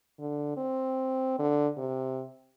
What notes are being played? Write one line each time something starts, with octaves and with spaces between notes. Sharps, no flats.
D3
C4
D3
C3